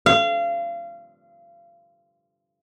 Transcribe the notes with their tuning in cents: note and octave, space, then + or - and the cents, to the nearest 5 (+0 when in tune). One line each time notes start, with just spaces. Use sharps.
F5 -30